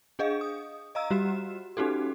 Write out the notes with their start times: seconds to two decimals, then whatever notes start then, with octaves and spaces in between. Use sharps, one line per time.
0.19 D4 G#4 D#5 F5
0.41 D#6
0.95 D#5 F5 A#5 E6
1.10 G3 F#4 G4 E7
1.77 C#4 D#4 F#4 G4 A4